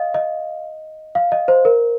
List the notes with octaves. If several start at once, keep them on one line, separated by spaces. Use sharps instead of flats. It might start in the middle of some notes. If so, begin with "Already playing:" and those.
Already playing: D#5 F5
D#5
F5
D#5
C5
A#4